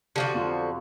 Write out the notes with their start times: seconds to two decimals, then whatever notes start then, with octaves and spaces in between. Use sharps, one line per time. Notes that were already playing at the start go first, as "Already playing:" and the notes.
0.16 D3 F3 F#4 G4
0.34 F2 F#3 F4